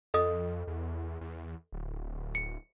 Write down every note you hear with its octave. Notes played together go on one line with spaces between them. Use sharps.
F2 A4 D#5 D#6
E2
E2
D1
C#7